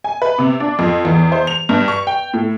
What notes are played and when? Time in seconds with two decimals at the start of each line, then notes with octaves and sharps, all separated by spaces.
0.04 G#5
0.22 B4
0.39 C3
0.60 D4
0.79 F2
1.05 E2
1.32 C5
1.47 F7
1.69 G2
1.88 C#6
2.07 G5
2.34 A2